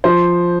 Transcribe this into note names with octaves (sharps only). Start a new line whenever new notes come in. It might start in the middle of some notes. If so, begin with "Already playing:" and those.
F3 C5